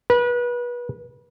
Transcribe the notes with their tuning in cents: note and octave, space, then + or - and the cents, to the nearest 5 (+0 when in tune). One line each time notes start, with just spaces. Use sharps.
B4 -30